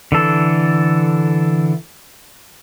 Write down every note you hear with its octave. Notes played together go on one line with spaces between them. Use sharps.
D3 E3 A4